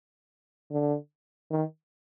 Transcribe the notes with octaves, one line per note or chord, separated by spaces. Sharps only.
D3
D#3